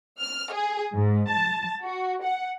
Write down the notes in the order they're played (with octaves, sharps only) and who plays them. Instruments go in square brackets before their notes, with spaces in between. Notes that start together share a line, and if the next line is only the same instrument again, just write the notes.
[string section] F6
G#4
G#2
A5
F#4
F#5